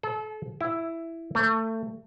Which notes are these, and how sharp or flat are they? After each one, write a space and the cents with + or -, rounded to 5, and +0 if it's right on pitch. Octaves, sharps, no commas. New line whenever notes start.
A4 -35
E4 +5
A3 +25